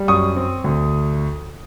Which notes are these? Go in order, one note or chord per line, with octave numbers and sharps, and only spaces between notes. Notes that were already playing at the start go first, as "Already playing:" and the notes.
Already playing: G3
F#2 C#6 D#6
C4
D2